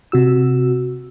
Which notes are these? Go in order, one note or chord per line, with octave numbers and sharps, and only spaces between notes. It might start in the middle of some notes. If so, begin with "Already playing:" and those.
C3 F#4 E6